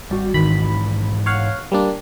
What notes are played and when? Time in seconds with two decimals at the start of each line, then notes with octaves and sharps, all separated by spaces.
0.11 G#1 G3 F#4
0.34 G#2 D#3 E3 B5
1.26 C#5 F5 F#5
1.72 G3 A#3 D4